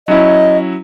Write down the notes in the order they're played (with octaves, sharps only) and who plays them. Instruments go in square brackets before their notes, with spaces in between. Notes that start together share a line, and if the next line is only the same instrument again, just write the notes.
[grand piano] F#3 C#4 E4 [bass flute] D#5